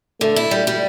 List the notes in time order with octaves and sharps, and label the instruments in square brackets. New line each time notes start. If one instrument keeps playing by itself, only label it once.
[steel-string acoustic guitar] D3 [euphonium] A3
[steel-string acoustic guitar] E4
G3
G3